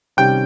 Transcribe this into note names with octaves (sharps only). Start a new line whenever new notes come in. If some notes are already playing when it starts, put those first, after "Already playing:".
C3 D#3 G3 C#4 G4 G5